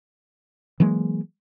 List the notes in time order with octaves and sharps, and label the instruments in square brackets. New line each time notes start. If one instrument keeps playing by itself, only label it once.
[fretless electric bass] E3 F#3 G#3 A#3